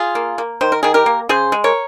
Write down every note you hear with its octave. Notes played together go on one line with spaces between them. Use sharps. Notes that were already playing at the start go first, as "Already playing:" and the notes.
Already playing: F4 G#4
A#3
A#3
D#3 C5
A#4
D#3 G#4
G4 A#4
A#3
C#3 G#4 C5
G#3
A#4 C#5